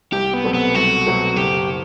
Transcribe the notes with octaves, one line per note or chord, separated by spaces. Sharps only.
C2 G4
B3
B2 F#3 A3 C4
B3
C2 F#4
B2 F#3 A3 C4
F#1 G4